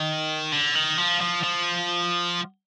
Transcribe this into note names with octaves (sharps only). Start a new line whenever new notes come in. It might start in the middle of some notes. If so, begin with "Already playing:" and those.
Already playing: D#3
D3
D#3
F3
F3
F3